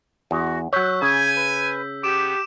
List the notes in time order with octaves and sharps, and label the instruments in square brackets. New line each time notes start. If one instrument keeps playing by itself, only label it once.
[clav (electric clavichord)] E2 [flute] F#4
[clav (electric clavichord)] F#3 C#5 [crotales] E6 G6 B6 [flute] F#6
[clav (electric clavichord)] C#3 [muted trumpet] G#5 [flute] G#6
[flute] B4
[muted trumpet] B3 [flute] G4 [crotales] D6 D7 E7